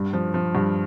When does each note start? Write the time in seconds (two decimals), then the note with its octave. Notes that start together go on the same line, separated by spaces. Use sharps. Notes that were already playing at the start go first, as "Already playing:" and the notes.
Already playing: G2
0.13 F3
0.34 F3
0.55 G2